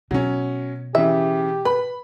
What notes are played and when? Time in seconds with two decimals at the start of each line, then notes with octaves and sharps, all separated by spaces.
0.11 B2 F#3 C#4
0.95 C#3 E3 G4 E5
1.65 B4 B5